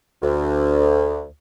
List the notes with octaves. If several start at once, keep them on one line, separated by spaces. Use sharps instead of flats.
D2